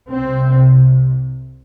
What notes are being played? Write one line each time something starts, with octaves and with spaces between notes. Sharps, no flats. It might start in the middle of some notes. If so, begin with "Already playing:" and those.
C2 C3 C4